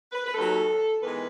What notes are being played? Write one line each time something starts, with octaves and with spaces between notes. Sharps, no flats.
B4
B4
D#2 D#3 F#3 A4
E2 D#3 G#3 B4